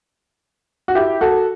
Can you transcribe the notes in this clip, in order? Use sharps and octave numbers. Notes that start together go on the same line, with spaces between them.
F#4
E4 G4
F#4 A4